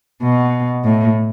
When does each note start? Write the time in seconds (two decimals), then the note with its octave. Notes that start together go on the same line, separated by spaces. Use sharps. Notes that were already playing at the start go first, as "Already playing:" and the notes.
0.22 B2
0.84 A2